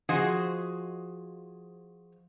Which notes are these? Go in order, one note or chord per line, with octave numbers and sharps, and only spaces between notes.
F3 F#4 G#4 C5 D#5